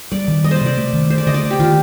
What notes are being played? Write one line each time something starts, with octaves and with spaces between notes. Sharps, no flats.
G3 D5
D#3
G3 D#5
C5 D5
C3 D5
A3
D#3
A3 C5
D5
D3 D#5
D5
A3
G4
D#3 F4